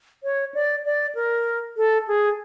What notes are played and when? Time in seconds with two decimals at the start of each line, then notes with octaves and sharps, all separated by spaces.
0.23 C#5
0.54 D5
0.85 D5
1.15 A#4
1.77 A4
2.08 G#4